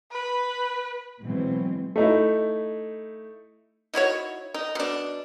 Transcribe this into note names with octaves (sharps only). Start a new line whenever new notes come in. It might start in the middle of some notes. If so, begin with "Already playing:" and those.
B4
B2 E3 F#3 G#3 C4
A3 D#4 E4
D#4 E4 F#4 C#5
D#4
B2 D4